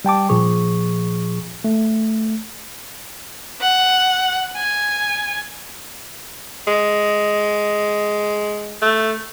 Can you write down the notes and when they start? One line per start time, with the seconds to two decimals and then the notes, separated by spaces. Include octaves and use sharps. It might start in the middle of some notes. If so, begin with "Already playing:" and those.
0.05 G3 G5 A5 D6
0.29 A#2 F3 G#4 C#6
1.64 A3
3.61 F#5
4.56 G#5
6.67 G#3
8.82 A3